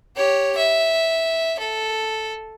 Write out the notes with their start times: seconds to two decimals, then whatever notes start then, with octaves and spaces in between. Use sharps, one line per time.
0.16 G4 C#5
0.57 E5
1.59 A4